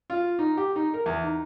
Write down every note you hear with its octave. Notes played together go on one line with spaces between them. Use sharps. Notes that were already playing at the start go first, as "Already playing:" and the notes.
F4
D#4
G4
D#4
A#4
E2
D#4